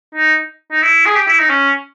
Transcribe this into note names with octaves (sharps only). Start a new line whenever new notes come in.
D#4
D#4
E4
G#4
G4
E4
D#4
C#4